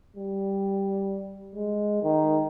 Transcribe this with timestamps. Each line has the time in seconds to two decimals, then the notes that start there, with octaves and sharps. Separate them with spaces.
0.17 G3
1.55 G#3
2.03 D#3